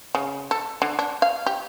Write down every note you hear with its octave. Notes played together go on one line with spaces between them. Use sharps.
C#3
A4
D3
D4
F5
G4